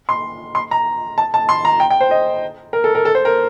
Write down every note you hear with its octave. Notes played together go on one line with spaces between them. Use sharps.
C6
C6
A#5
A5
A5
C6
A#5
G5
G5
C5
D#5
A#4
A4
A#4
A4
C5
A#4